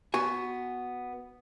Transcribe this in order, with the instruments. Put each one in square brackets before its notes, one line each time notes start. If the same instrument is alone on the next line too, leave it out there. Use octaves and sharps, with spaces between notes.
[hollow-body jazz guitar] B3 F#4 G#5